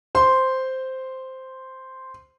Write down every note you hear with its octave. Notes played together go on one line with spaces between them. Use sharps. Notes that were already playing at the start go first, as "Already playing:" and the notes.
C5 C6